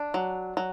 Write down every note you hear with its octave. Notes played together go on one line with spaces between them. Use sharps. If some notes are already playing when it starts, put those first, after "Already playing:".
Already playing: D4
F#3
F#3